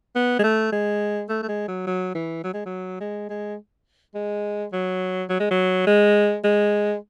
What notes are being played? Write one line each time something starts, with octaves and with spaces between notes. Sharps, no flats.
B3
G#3
A3
G#3
A3
A3
G#3
F#3
F#3
E3
F#3
G#3
F#3
G#3
G#3
G#3
F#3
F#3
G#3
F#3
G#3
G#3